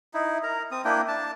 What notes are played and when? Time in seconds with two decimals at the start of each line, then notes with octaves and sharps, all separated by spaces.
0.14 D#4 E4
0.43 A#4 A#5
0.71 C4 D#6
0.85 A#3 D4 E4 G5
1.08 D4 A5